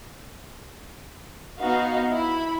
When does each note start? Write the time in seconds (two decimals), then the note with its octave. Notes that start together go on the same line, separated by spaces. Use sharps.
1.59 B3 D#4 F#4 F5
2.11 E4 B5